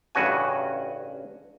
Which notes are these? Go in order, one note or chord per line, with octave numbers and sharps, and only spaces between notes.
A1 G2 C#3 F#4 G#5